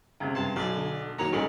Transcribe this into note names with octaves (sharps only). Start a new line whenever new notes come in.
C#2 C3 A#5 G#6
G2 A5 A#5 C6 C7
B1 F#3 D5 G#5
D3
D#2 D#3 F#3 A#3 C#5 A#5
A1 A2 G3 G#3